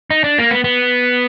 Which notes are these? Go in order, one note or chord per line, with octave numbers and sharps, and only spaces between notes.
D#4
D4
A#3
B3
B3